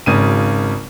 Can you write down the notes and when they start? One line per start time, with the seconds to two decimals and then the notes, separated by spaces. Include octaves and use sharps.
0.06 G#1 C#3 D#7